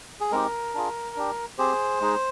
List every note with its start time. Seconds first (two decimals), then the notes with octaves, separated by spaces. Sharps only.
0.20 G#4
0.32 G#3 C4 D#4 G4 A#4
0.74 D4 F4 G#4
1.16 D4 G4
1.58 C4 G4 G#4 C5
2.01 G#3 D#4 G#4